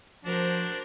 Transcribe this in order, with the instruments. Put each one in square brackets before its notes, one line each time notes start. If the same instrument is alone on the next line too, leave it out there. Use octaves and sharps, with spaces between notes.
[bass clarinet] F3 [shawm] D4 [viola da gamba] F#4 A#4 C5